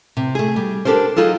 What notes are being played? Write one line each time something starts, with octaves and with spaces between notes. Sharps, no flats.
C3
A3 G#4
G3
D4 G4 A4 A#4 C5
F#3 D#4 F4 G#4 A4